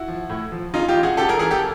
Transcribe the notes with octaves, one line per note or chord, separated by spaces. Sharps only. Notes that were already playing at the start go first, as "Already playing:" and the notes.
Already playing: E4 F#4
F3
A2
F3
C#3 D#4 F4
F4 G4
E3
F#4 G#4
C#3 G4 A4
G#4 A#4
E3 G#4 A#4
G4 A4